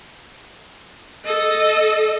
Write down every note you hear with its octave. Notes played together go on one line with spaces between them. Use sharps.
A4 D#5